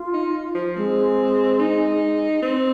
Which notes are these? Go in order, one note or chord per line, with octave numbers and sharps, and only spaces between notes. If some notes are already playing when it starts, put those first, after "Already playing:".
Already playing: F4
D#4
F3
G#3 C4
D#4
C4